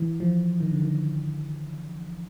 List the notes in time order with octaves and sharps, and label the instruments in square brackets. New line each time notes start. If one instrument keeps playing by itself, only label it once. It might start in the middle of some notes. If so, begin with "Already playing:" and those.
Already playing: [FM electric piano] E3
F3
D#3
D3
D#3